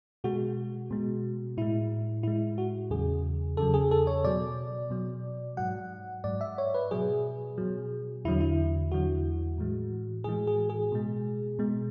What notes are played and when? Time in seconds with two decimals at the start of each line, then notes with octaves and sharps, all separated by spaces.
0.24 B2 G#3 F#4
0.91 B2 G#3
1.57 A2 G#3 E4
2.23 A2 G#3 E4
2.58 F#4
2.90 E2 C#3 F#3 G#4
3.57 E2 C#3 F#3 A4
3.74 G#4
3.91 A4
4.07 C#5
4.24 B2 F#3 D5
4.90 B2 F#3
5.57 G#2 F#3 F#5
6.24 G#2 F#3 D5
6.41 E5
6.58 C#5
6.74 B4
6.91 B2 F#3 G#4
7.58 B2 F#3
8.25 E2 D3 F#3 E4
8.41 E4
8.91 E2 D3 F#3 F#4
9.58 A2 E3 G#3
10.24 A2 E3 G#3 G#4
10.47 G#4
10.69 G#4
10.92 B2 G#3
11.59 B2 G#3